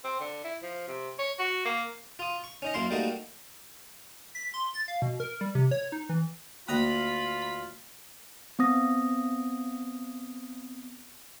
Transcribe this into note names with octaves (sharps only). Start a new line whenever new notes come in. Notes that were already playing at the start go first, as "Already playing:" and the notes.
C4
D3
E4
F3
C3
C#5
F#4
A#3
F4 D#6
C#6
C#4 D#4 D#5
F#2 A#3 E4 F5 C6
G3 A3 A#3 D#4 F#4 A#4
B6
C6
A6
F5
B2
A#4
G3
C3
C#5
D#4
E3
D2 A#3 F4 A#5 B5 D#6
B3 C4 D#6 A#6